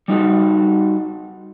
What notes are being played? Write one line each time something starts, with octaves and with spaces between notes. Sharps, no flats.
G3 D#4 F#4